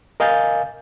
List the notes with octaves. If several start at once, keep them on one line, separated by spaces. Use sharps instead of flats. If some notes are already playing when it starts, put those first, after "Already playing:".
A#4 D#5 F5 G#5 G6 A6